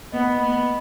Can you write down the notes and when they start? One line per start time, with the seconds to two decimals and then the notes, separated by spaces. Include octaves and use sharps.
0.12 B3 D#5
0.21 B5
0.41 B3